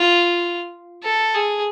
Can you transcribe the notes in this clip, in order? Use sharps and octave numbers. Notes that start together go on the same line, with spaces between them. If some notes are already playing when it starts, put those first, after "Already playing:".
Already playing: F4
A4
G#4